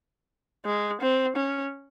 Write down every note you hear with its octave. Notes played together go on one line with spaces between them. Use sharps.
G#3
C4
C#4